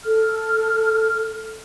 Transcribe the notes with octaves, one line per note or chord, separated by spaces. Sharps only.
A4 F6